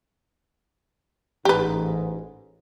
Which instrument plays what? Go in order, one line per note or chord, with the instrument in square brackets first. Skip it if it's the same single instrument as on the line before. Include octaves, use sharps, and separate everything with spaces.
[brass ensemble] A1 G#2 [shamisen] G4 B4